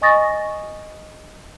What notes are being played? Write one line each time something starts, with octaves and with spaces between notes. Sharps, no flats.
D#5 G#5 C#6 D#6 A6 A#6